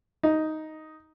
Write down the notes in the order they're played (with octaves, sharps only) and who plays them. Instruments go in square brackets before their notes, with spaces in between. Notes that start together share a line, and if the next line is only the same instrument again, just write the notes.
[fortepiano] D#4